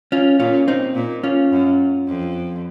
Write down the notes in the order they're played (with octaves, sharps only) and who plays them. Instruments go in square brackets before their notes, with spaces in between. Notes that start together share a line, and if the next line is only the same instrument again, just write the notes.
[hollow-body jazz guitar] C#4 F4
[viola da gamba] A#2 [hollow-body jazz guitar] C#4 F4
[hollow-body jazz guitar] C4 D#4
[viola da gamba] A#2
[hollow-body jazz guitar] C#4 F4
[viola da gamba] F#2
F2